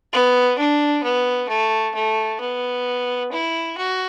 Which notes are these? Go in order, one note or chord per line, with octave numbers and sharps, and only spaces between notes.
B3
D4
B3
A3
A3
B3
E4
F#4